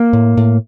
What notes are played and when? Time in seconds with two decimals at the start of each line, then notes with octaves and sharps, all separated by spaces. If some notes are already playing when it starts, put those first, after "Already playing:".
Already playing: A#3
0.13 A2
0.37 A2